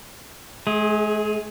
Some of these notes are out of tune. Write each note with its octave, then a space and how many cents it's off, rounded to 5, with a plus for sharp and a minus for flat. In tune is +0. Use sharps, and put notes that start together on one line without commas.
G#3 +45 G#4 +0